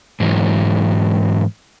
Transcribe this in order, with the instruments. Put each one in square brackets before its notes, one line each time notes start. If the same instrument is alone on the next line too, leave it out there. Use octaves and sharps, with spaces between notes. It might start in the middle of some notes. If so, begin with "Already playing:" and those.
[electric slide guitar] G#2 E3 F#3